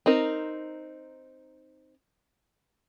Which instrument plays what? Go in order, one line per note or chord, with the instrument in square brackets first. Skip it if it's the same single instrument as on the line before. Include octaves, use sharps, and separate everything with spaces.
[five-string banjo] C4 D#4 A#4